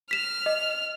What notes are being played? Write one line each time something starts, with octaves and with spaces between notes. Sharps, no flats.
F6 B6 E7
D#5